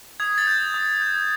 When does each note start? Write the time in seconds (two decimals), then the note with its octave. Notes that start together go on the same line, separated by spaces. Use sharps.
0.20 D#6 G#6
0.38 A6
0.47 G6
0.74 D#6
1.01 G6